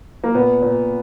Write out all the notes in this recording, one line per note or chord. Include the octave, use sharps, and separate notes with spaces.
A#3
A#2 B3
A#2